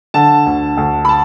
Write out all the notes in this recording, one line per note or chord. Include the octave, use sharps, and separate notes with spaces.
D3 A5
D2
D2
B5
A5